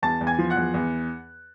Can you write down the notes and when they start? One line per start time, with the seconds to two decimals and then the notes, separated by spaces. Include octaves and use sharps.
0.02 E2 A5 A6
0.21 E2
0.27 G#5 G#6
0.39 F3
0.50 F#5 F#6
0.56 E2
0.74 E2